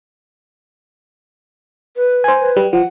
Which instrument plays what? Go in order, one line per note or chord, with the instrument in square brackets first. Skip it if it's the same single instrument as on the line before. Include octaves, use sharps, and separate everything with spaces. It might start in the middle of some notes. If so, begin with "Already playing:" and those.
[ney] B4
[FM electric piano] C5 G#5
[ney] B4
[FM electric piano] G3
[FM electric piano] F3 [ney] F#5